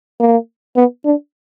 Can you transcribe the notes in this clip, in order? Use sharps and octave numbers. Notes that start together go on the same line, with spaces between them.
A#3
B3
D4